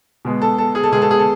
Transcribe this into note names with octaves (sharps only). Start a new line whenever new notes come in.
B2 G#3 B3
A4
A4
G#4
A4
B2 G#3 B3 G#4
A4
G#4
A4